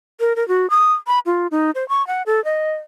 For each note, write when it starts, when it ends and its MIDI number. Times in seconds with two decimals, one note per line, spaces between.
0.20 0.36 70
0.36 0.46 70
0.48 0.69 66
0.70 0.93 87
1.07 1.19 83
1.26 1.47 65
1.51 1.71 63
1.75 1.87 72
1.89 2.05 85
2.07 2.22 78
2.26 2.43 69
2.45 2.72 75